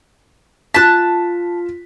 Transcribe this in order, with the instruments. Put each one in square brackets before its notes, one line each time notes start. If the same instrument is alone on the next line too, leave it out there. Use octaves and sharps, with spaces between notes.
[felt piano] F4 B6 [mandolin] A5 F#6